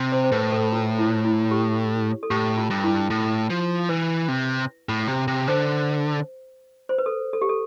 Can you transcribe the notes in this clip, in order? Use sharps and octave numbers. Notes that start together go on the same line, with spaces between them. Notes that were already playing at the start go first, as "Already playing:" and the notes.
Already playing: C3
C5
C5
A2 B4
A4
F4
E4
E4
G4
A4
A2 G4
F4
G2
E4
A2
F3
E3 B4
C3
A2
C3
C3
D3 C5
C5
B4
A4
A4
G4
A4